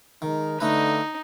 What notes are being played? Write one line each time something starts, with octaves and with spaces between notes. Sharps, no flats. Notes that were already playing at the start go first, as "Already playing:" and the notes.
D#3 G#3 D#4 A#4
D3 A3 D#4 B4